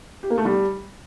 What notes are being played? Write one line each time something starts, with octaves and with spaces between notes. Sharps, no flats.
G4
A#3
A3
G3